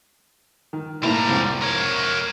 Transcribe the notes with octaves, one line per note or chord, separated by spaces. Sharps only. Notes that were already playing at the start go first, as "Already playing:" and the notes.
D#3
A2 G3 A#3 E4 A#5
C2 F2 G#2
A#4 C#5